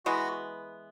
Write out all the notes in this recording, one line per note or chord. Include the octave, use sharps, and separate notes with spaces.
E3 G#3 B3 F#4